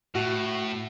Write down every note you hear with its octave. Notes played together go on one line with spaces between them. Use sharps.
A2 F#4